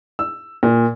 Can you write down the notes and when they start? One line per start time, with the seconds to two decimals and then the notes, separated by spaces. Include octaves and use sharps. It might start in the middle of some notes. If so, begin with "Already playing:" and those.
0.19 E6
0.63 A#2